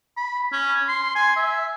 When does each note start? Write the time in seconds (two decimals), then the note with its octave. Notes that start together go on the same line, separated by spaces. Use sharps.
0.17 B5
0.52 C#4
0.88 C6
1.15 G#5
1.36 E5